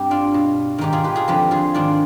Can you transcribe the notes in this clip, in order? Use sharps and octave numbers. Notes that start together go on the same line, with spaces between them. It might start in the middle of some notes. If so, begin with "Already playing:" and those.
Already playing: G2 C4 G4
D4 F4
B2
G#2 D#3 D#4 G4
F4 G#4
G4 B4
F4 G#4
F2 D3 F3 G4 B4
F4 G#4
G#2 D#3 D4 F4